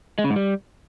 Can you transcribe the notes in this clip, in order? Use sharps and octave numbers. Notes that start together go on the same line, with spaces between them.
G#3
C#3
G#2
G3